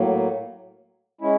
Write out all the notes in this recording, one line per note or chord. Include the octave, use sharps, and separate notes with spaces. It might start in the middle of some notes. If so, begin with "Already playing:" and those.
Already playing: A2 F#3 A#3
G#3 C#4 E4